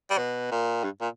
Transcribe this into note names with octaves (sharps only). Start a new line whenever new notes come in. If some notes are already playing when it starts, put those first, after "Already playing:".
G3
B2
A#2
G2
A#2